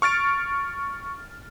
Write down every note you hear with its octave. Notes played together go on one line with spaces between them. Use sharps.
C#6 F6 A6 D7